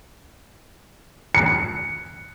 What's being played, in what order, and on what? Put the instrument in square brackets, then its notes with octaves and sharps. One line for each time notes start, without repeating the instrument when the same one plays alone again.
[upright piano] C#7